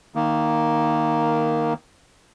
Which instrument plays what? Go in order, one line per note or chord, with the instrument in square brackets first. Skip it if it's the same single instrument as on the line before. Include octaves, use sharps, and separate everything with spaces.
[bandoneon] D#3 A#3